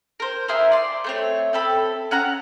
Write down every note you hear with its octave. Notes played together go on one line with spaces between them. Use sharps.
A#4 C5
E4 G#4 A#4 C5
D5 C6
A3 C4 C#5
C4 A4 B5
C#4 F#5 A#5 F#6